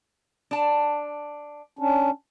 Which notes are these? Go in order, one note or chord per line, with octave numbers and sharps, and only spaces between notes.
D4 A5
C#4 D4